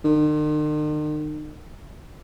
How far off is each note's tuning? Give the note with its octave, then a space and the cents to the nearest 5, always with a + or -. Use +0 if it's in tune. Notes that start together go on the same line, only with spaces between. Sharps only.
D#3 -45